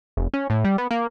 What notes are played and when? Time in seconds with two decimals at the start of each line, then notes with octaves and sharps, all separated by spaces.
0.17 F1
0.34 C#4
0.50 A2
0.64 G3
0.78 B3
0.91 A#3